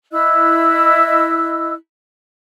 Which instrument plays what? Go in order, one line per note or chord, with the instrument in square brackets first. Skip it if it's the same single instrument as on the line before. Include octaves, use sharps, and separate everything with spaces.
[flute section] E4 D#5 E6 F#6